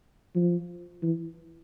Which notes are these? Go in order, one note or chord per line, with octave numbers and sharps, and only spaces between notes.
F3
E3